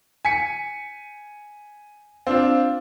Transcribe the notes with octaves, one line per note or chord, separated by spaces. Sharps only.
G#5 B6 C#7
C4 D4 F4